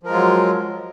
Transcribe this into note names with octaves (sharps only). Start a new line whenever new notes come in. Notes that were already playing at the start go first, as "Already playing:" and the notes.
F3 F#3 G#3 F4 A#4